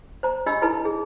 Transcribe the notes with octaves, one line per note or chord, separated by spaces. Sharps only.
C5 A#5
D4 G4 D#5 B5 E6
D#4 E4 A4 B4 A#5
G#4